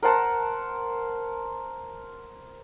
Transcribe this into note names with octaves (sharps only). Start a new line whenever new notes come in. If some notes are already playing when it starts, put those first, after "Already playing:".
A#4 C5 F#5 A5